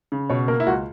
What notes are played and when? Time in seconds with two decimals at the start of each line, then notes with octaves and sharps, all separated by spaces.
0.12 C#3
0.30 B2 C#5
0.48 A#3 A#4
0.60 E4
0.67 C#2 F#4